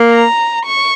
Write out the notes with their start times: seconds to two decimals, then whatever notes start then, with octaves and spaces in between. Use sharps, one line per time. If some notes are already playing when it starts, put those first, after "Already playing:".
Already playing: A#3
0.11 A#5
0.65 C#6